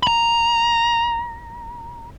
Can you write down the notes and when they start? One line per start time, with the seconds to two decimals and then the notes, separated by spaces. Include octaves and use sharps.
0.03 A#5 B5